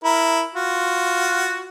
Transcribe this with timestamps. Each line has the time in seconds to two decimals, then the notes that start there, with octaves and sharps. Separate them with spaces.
0.04 E4 A#4
0.55 F4 F#4